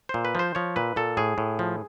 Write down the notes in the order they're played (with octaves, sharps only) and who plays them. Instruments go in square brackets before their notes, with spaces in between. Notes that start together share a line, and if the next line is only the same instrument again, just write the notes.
[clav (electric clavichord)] A#2 C5
B4
F3 C5
F3 C#5
A#2 B4
A#2 A4
A2 G#4
A2
F3